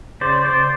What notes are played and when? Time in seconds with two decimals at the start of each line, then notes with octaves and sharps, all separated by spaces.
0.21 C#3 C5 D5
0.44 C5 D5